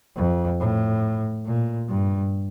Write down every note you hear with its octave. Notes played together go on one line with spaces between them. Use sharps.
F2
A2
A#2
G2